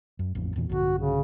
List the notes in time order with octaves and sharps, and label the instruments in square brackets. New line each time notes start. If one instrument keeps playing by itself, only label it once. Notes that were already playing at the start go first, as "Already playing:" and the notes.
[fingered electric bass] F#2
A1 F2
E2 A#2 E3
[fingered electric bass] A#1 G2 D3 [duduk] F#4
[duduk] C#3